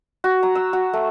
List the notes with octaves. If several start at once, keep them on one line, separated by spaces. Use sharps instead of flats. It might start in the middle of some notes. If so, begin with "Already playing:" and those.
F#4
A#5
E6
F#4
A3